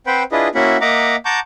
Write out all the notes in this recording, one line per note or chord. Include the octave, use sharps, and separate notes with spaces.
C4 B4 C5 F#5 G5 B5
D4 E4 F4 G#4 B4 D#5
A#3 C#4 E4 F#4 E5 F#5
A#3 D#5 E5 F#5 A#5 D6
F#5 A5 A#5 C#6 D6 G6